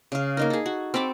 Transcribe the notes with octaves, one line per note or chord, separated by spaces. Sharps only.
C#3 F5
A#3 D#4 A#4
G#4 A4
F#4
C4 A4 B5 D6